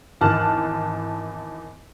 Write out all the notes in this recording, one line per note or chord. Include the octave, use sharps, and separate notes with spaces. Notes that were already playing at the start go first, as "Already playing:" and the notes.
G#1 E2 A5 F6 F#6